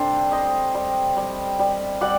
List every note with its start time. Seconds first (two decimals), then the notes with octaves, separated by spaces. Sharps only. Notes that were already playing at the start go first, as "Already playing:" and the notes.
Already playing: C3 G3 D4 A4 C5
0.32 C3 C5 D#5
0.74 G3
1.17 G3
1.59 G3
2.01 G3 D5 F#5